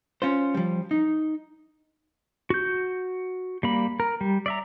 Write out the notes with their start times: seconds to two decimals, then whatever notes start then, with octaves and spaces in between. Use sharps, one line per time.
0.22 C#4 F4 C5
0.54 F3 G3
0.91 D#4
2.50 F#4 G6
3.63 G3 A#3 B5
4.00 A#4
4.21 G3
4.46 D5 E5 A#5